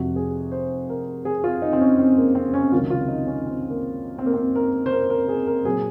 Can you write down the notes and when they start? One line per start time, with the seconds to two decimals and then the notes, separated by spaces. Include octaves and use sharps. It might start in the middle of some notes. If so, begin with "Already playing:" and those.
Already playing: F1 F2 C3 F#4
0.16 G#4
0.52 C5
0.89 A#4
1.25 G#4
1.44 F4
1.62 D#4
1.73 C4
1.81 C#4
1.99 C4
2.17 A#3
2.35 C4
2.54 C#4
2.72 C#2 C3 D#3 F#3 F4
2.90 F4
3.08 D#4
3.27 C#4
3.46 C4
3.70 A#3
4.18 C4
4.26 A#3
4.34 C4
4.56 A#4
4.86 C5
4.92 A#4
5.10 A#4
5.28 G#4
5.47 A#4
5.65 A#2 F#3 G#4